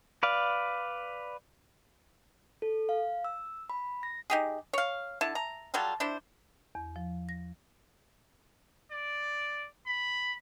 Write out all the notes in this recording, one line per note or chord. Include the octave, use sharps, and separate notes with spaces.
B4 D5 F5
A4
F5
E6
B5
A#6
D#4 G4 G#4
C#5 F5
D3 E4 A5
A#5
F#3 G3 F4 A4
D4 E4 C5
E2
F3
A#6
D5
B5